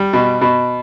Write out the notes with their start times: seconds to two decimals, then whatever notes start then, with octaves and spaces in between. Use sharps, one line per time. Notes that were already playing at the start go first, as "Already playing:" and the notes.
Already playing: G3
0.13 B2
0.41 B2